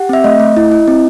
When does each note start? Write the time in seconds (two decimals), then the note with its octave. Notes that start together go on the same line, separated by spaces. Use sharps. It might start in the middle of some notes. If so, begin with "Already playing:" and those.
Already playing: G4 F#5
0.09 C4 E5
0.24 A3 D#5
0.40 A3
0.56 E4
0.71 E4
0.88 C4